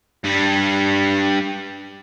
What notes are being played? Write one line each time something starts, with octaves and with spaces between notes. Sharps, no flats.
G2 G3